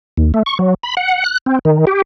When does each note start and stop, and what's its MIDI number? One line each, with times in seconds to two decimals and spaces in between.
0.17 0.32 39
0.34 0.43 57
0.46 0.58 85
0.59 0.74 54
0.83 0.95 83
0.97 1.24 78
1.24 1.38 90
1.46 1.59 60
1.65 1.85 51
1.87 2.02 67